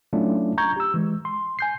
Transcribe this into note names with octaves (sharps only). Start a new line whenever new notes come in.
F#3 A3 C#4 D4 E4 F4
A#5 C#6 G6 G#6
G4 E6
E3 G#3
C6
G#5 G6 C7